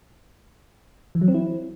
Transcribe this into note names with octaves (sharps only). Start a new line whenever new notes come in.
E3
F#3
C4
E4